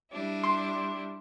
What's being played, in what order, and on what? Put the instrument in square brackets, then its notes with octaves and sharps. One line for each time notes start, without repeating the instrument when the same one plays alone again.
[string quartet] G3 D4 E4
[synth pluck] C6